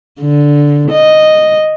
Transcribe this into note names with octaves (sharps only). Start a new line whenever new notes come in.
D3
D#5